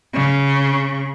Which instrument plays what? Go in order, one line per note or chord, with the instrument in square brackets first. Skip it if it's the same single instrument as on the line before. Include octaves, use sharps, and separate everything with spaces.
[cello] C#3